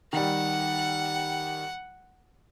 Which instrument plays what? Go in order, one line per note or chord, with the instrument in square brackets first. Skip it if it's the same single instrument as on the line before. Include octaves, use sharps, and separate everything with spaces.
[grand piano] D#3 G3 [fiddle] F#5